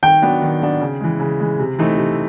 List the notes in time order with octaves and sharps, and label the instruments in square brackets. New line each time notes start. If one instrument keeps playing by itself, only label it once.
[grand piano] D#3 [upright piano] G5
[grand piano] F#3 B3 D4
D#3
F#3 B3 D4
C#3
E3 G#3
C#3
E3 G#3
C3
E3 A3 C4 D#4
C3